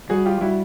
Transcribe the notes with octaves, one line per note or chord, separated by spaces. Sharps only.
G3 F#4 G#4
F4 G4
G3 E4 F#4